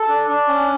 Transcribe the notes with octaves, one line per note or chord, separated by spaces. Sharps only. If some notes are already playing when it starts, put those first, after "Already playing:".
Already playing: A4
D4
D4
C#4